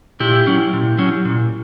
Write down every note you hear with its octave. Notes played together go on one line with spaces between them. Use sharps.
A#2 E4 G4
F#3 C#4
A#2
F#3 C#4
A#2